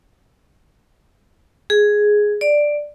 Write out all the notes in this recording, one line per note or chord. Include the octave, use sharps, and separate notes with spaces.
G#4
D5